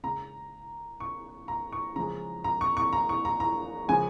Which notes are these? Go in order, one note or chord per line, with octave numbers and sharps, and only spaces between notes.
C#3 G#3 A#5
C#6
A#5
C#6
C#3 F3 G#3 A#5
A#5
C#6
C#6
A#5
C#6
A#5
A#5
C#3 F3 G#3 G#5